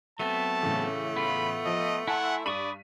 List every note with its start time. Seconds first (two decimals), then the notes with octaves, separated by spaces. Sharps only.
0.19 F#3 A3 B3 C4 A5 D#7
0.62 A2 C#3 E3
1.17 B3 F4 B5
1.66 F3 D#5
2.08 E4 E5 F#5 G#5 A5 C6
2.46 G2 D5 B5 C#6 D#6 B6 D#7